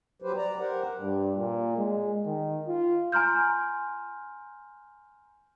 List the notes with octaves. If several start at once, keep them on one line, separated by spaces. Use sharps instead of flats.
F#3 G4 B4 C5
D5 A#5
G4 A#4 C5 F#5
G2
A#2
G#3
D#3
F4
G#5 A#5 C6 F6 G6